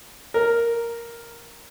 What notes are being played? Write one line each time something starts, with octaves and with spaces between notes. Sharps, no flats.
A#4